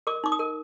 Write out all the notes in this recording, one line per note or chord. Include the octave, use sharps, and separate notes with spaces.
A#4 D6
D#4 D6
D#6
A#4